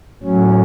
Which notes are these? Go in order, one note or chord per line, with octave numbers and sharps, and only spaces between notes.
A2 F#3 C#4